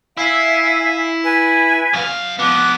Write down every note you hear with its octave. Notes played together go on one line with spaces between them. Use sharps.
E4 E5 F5 G#5
B4 G#5
F#2 F5
F3 B3 D6 F#6